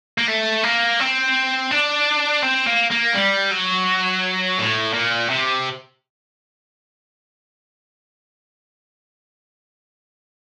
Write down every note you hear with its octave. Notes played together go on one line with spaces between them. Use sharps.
A#3
A3
A#3
C4
D4
C4
A#3
A#3
G3
F#3
A2
A#2
C3